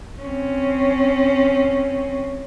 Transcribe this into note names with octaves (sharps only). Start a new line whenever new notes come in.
C4 C#4